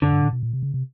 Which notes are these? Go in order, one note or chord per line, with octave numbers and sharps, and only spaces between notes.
F#2 D3
G2
A2
B2
A#2
C3
C#3
C3